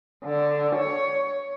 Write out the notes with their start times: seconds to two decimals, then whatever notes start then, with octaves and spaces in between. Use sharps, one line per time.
0.25 D3
0.75 C#5